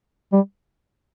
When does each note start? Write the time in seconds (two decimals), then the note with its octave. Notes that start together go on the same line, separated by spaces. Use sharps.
0.33 G3